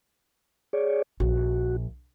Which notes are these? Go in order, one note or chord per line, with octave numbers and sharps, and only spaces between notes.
G#4 C#5 D5
A#1 F#4